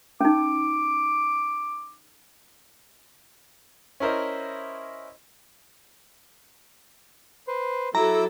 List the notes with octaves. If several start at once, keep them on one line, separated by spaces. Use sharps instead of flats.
C#4 D#4 D6
C#4 E4 A#4 C5 D#5
B4 C5
F#3 E4 A4 A#5 D6 E6